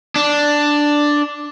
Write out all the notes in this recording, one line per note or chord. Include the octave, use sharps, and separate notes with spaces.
D4